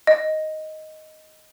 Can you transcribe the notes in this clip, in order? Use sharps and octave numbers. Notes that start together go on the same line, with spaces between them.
D#5